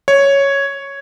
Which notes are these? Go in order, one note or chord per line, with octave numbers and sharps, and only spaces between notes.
C#5